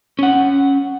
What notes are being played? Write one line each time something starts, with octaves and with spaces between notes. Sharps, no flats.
C#4 F#5